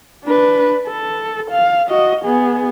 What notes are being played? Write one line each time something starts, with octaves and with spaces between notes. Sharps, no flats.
D4 B4
A4
F5
F#4 D#5
B3 G#4